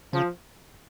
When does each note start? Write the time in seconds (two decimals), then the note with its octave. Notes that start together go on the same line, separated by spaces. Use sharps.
0.13 C#3 F3